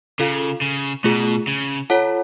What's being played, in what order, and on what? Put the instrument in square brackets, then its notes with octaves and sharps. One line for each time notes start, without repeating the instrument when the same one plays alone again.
[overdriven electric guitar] C#3 [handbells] F4 A4 F5
[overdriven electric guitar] C#3
[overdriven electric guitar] B2 [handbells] A3 F4 G#4
[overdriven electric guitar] C#3
[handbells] F4 A4 C#5 F#5 A5